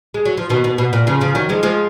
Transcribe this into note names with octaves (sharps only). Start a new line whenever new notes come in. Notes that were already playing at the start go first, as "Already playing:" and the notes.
G#3
F#3
F3
B2 D#3
B2
B2
A#2
C#3 F3
C#3 F3
D#3 F#3
F3 G#3
F3 G#3